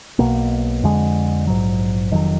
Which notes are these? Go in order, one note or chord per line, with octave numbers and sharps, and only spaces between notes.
B1 B2 A#3
F2 D3 G#3
A#1 G#2 F#3
F1 F2 D#3 F#3